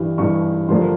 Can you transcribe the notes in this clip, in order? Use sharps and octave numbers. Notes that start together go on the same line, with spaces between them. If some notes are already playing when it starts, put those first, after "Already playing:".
Already playing: G2 E3 G3
G2 E3 G3 C#6
G2 D3 F3 A#3 C6